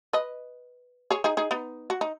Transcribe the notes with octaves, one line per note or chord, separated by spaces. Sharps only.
B4 D#5
G#4 C#5
D#4 G#4
D#4 G#4
B3 D#4
F#4
D#4